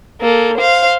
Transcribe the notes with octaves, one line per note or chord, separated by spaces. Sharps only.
A#3 A4
C5 F5